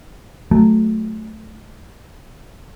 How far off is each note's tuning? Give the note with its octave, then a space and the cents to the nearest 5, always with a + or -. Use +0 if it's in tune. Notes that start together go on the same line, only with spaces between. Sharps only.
F#3 +0 A3 -10